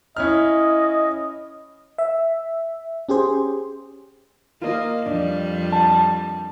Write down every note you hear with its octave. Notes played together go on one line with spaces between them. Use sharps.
C#4 E4 D#5 F6
E5
C#4 G4 G#4 C5
A#3 F4 A#4 D#5
F2 G3 D4
A5